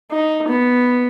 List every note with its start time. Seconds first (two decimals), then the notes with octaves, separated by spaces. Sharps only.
0.11 D#4
0.48 B3